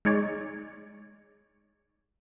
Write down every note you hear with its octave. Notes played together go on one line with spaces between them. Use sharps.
G#3 D#4 C#5 D5